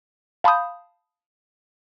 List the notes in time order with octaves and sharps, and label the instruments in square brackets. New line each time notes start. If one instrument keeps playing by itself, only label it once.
[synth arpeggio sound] F5 A5 B5 C6 D#6 G6